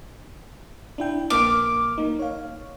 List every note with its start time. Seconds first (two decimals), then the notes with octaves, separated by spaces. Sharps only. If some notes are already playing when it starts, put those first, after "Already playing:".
0.98 D4 E4 G5
1.30 A#1 A#3 D6 F6
1.98 A#3 D#4
2.19 C#5 F5